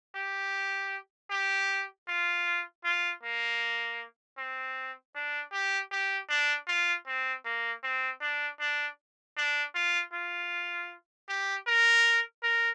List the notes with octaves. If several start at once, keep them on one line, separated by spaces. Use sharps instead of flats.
G4
G4
F4
F4
A#3
C4
D4
G4
G4
D4
F4
C4
A#3
C4
D4
D4
D4
F4
F4
G4
A#4
A#4